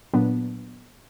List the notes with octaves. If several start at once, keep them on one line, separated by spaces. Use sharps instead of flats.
A#2 F#3 B3 D4